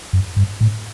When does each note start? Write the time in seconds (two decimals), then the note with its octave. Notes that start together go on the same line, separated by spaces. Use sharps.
0.13 F#2
0.36 G2
0.61 A2